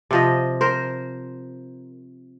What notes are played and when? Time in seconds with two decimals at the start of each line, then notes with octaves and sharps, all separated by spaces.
0.11 C3 F3 D#5
0.61 A#4 C5